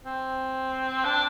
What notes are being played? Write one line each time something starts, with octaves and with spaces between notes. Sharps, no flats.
C4
D4